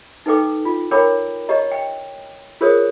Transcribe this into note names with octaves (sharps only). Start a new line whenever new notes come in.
D#4 A4 B4 G5 D6
F4
A#4 C#5 G5 A#5 B5 D6
G4 C#5 D#5 A#5
G5
F4 G#4 A#4 C5 C#5 D#6